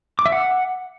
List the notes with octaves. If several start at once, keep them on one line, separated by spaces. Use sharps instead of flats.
D6
E5
F#5